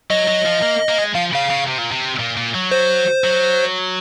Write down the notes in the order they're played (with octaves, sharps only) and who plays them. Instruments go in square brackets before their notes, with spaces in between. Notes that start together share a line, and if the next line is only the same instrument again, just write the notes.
[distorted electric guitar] F#3 [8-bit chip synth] D#5
[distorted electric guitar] F#3
F3
A#3
A#3
G#3
[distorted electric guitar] F3 [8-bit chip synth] F5
[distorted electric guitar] C#3 [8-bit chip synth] F5
[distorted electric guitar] C#3
C3
A#2
C3
A#2
A#2
F#3
[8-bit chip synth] C5
[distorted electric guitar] F#3